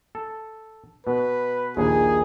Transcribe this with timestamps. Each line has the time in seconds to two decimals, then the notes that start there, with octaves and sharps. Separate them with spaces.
0.15 A4
1.07 B2 B4
1.77 A#1 D#2 G#4